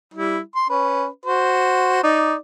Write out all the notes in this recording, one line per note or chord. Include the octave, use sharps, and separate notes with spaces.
G3 E4
C6
C#4 B4
F#4 C5
D#4 D5